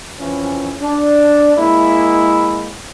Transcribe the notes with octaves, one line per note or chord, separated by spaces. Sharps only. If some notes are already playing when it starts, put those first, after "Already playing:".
F2 E3 C#4
D4
G#3 A#3 E4